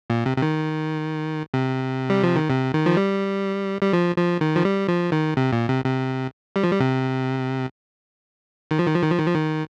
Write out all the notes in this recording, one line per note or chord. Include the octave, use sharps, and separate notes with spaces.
A#2
C3
C3
D#3
C3
G3
F3
D#3
C3
D#3
F3
G3
G3
F3
F3
D#3
F3
G3
F3
D#3
C3
A#2
C3
C3
G3
F3
G3
C3
D#3
F3
D#3
F3
D#3
F3
D#3
F3
D#3